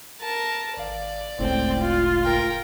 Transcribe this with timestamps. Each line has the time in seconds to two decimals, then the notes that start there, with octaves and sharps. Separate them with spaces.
0.21 A#4 A5
0.77 G#1 D5 F5
1.39 F#1 C#2 A2 C4 G5
1.80 F4
2.25 A#4 G5